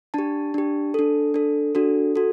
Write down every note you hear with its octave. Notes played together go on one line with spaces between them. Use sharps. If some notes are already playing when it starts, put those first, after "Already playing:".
D4 G4 A5
D4 G4
D4 A4
D4 A4
D4 F#4 A4
F#4 A4